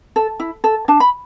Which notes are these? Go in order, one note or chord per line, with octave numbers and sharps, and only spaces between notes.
A4
E4
A4
D4 A5
B5